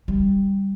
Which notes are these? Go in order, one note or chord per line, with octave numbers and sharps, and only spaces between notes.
G3